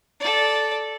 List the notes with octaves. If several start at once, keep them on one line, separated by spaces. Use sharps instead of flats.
A4 D5